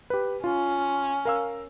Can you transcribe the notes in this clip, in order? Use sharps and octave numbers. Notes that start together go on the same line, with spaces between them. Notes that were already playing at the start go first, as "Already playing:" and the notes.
G4 B4
C#4 F4
A#4 F5 E6